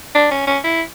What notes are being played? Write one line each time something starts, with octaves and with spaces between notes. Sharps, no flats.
D4
C#4
C#4
E4